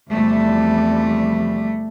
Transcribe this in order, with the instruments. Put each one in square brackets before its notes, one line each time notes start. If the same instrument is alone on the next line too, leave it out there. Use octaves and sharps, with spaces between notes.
[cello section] E2 C3 F3 G3 A3